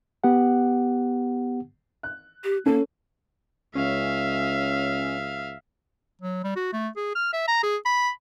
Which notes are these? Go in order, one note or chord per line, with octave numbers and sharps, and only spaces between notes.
B3 G4 F#5
F#6
G4
A#3 C#4 A4
C#2 C#4 E5 F5
F#3
G3
F#4
A3
G#4
F6
E5
A#5
G#4
B5